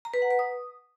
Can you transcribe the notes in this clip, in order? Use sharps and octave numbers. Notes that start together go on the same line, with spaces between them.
A#5
B4
F#5
B4
D#6